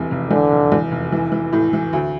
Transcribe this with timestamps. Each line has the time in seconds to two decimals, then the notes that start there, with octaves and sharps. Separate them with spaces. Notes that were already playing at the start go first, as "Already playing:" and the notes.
Already playing: F1 E2 C3
0.11 F1
0.30 E2 D3
0.52 F1
0.72 E2
0.91 F1
1.12 E3
1.32 E3
1.53 A2
1.73 E3
1.93 D2